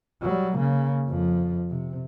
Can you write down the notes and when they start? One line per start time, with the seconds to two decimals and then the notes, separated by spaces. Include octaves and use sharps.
0.22 F#3 G3
0.56 C#3 A#3
1.08 F2 F3
1.70 C3